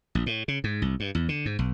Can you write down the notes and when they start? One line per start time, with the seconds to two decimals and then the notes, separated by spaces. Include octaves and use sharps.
0.15 A#1
0.26 A2
0.48 C#3
0.64 G#2
0.82 C2
1.00 G2
1.15 E2
1.29 D3
1.46 G#2
1.59 B1